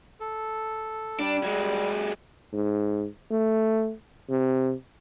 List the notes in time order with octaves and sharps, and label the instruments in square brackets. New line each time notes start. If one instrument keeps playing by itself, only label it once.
[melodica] A4
[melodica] G3 [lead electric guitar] D4
[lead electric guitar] F#3 G#3
[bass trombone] G#2
A3
C3